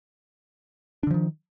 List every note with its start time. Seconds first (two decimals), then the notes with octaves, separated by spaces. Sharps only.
1.03 D4
1.07 D3
1.11 F3
1.14 D#3